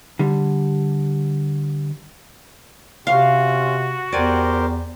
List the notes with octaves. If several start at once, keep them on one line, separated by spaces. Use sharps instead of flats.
D3 G3
C3 C#4 F4 F#4 F5
E2 G4 A#4 C5 D5 G#5